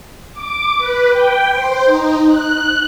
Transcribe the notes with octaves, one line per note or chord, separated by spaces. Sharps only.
D6
B4
G5
C5
D#4
F#6